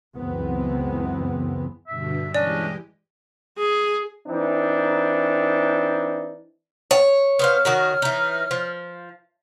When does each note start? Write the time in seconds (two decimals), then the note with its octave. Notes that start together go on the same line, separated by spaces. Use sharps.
0.16 C#2 F#2 E3 G#3 B3 C4
1.88 G2 B2 D3 E5
2.35 E3 G#3 C#4 D4 G4 D5 D#5
3.58 G#4
4.27 E3 C4 D4 D#4
6.91 C#5
7.39 B3 C5 F5 F6
7.65 D#3 F#4 A#4
8.02 E3 D#4
8.51 F3